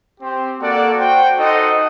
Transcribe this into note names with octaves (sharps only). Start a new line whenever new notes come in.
C4 G4 C5
A#3 F#4 A4 D5 F#5
F#4 C5 G5
D#4 A4 C5 D#5 F#5